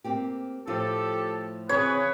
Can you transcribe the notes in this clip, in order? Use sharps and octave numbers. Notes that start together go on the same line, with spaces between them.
A#3 C4 G4
A2 F3 F4 G4 A4
C#3 E3 C4 G#4 B4 C#5